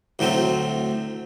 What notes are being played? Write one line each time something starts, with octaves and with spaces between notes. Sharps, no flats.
D2 A2 F#3 C4